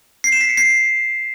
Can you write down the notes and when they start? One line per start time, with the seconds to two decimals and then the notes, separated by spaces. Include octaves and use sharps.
0.24 C7
0.32 E7
0.41 B6
0.49 C#7
0.57 C7